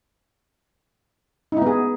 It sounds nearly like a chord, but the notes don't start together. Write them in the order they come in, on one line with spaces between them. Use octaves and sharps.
D#4 E4 B3 G#4